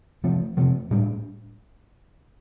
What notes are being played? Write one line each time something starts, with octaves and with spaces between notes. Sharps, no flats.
C3 F3 A3
C3 F3 A3
A2 G3 D4